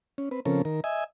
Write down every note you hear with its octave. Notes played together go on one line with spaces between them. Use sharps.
C#4
C4 B4
C#3 F3 C4 C#4 A4 A#4
D#3 A#4
D#5 E5 G#5